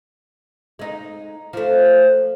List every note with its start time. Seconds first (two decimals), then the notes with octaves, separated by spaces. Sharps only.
0.79 G#3 D#4
1.53 F3 A3